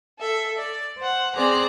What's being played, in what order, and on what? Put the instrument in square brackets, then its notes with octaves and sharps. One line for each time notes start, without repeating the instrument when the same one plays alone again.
[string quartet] A4 E5
D5
C5 F#5
C4 G#4 C5 D5 A#5 F#6